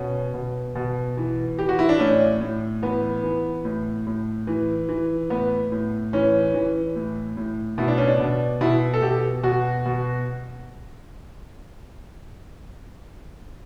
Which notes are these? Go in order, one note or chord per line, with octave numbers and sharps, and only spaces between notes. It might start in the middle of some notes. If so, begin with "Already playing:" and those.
Already playing: B2 C#4
B2
B2
E3
E3 G4
F#4
E4
D4
A2 C#4
A2
E3 B3
E3
A2
A2
E3
E3
A2 B3
A2
E3 C#4
E3
A2
A2
B2 E4
D4
C#4
D4
B2
B2 E4
A4
B2 G4
B2 F#4
B2